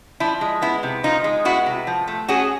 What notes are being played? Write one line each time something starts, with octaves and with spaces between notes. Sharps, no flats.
F3 E4
G#3
B3 E4
C3
F3 D#4 F4
G#3
B3 E4 F#4
C3
F3
A3
C#4 F#4 G#4